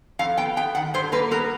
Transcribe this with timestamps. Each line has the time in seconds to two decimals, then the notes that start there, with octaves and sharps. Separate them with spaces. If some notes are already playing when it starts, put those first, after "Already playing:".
0.19 F2 F5
0.37 B3 G5
0.56 B3 G5
0.75 D#3 F#5
0.94 G2 C5
1.12 A#3 B4
1.31 B3 A#4